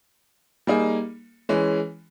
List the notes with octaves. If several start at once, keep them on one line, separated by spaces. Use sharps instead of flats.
G3 A#3 D#4 G#4
E3 G#3 C#4